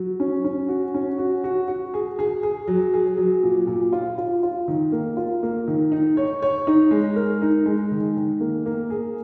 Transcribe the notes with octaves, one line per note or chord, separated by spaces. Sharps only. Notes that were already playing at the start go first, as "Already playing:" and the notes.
Already playing: F#3
C#4
C#4
F#4
C#4
F#4
F#4
F#4
G#4
G#4
G#4
F#3
G#4
F#3
A#2
A#2
F4
F4
F4
D#3
A#3
F4
A#3
D#3
D#4
C#5
C#5
D#4
G#3
A#4
D#4
G#3
D#3
D#3
A#3
A#3
G#4